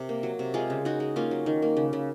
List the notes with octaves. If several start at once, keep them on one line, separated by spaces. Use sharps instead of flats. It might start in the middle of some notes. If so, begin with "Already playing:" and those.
Already playing: C3 A#4
A#3
F#3
C3
G#3 F4 G#4
C#3
G#3 D#4 F#4
G#3
A#3 C#4 F4
F#3
D#3
A#3
C#3
C#3